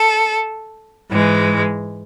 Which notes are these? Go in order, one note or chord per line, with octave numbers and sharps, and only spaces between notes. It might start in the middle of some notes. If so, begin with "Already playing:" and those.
Already playing: A4
G#2 E3 G#3